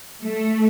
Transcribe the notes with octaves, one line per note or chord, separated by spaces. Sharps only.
A3